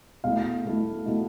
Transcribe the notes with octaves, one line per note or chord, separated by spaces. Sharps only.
B2 A3 E4 F5
B2 A3 E4
B2 A3 E4